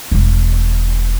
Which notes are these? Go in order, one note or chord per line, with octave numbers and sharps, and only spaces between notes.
E1 G3